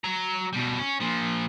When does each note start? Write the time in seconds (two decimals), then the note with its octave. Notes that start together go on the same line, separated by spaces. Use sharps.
0.04 F#3 A#5
0.53 B2 G3
0.79 C#4
1.01 A#2 F3